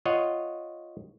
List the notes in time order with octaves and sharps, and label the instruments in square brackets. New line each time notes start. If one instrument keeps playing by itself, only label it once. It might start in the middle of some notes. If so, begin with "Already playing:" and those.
[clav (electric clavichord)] F4 C#5 D#5 F#5